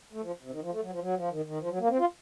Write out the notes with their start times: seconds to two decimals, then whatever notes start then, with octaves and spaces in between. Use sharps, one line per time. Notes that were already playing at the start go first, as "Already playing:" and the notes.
0.13 A3
0.23 F3
0.42 C3
0.52 D#3
0.62 F3
0.72 A3
0.82 F#3
0.91 F3
1.02 F#3
1.16 F3
1.31 D#3
1.45 D#3
1.60 F3
1.70 F#3
1.80 A#3
1.89 C4
1.99 F4